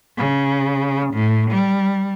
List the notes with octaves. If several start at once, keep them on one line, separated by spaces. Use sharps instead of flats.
C#3
A2
G3